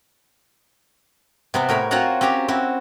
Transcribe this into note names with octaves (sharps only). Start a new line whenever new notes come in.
C3 B3 C4
A2 A#4 C#5 B5
C4 F4 F#4 C#5 F#5 A#5
C4 C#4 G4 A#5
C4 E4 F#4